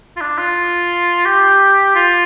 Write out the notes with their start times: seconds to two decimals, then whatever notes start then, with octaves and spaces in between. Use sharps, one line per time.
0.17 F4
0.21 D4
0.38 F4
1.26 G4
1.96 F4